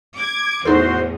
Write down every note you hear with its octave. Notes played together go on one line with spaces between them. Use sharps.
D6 G#6
E2 A2 D#4 F#4 G#4 A4 C5 C6